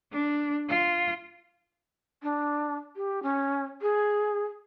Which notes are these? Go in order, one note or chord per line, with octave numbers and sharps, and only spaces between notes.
D4
F4
D4
G4
C#4
G#4